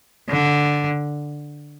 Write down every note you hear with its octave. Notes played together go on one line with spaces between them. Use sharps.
D3